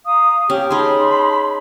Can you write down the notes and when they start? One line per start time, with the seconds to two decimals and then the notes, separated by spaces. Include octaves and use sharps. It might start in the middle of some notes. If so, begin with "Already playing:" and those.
0.07 F5 A#5 D#6
0.50 C#4 G4 G5
0.71 D#4 G#4 A5 B5 C6